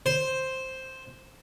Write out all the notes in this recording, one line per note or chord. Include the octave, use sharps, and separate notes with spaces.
C5